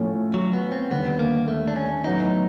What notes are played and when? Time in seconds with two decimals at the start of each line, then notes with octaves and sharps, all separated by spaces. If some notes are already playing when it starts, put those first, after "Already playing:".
Already playing: A2 F3 A3 C#4
0.34 F#3
0.53 B3
0.72 C4
0.91 D#2 D3 G3 B3
1.19 A#3
1.48 A3
1.68 D4
1.76 C#4
2.04 A2 F#3 B3 D#4